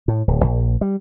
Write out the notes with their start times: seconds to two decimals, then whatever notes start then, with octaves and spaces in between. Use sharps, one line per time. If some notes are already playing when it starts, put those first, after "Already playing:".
0.08 A2
0.28 D1
0.44 A#1
0.81 G3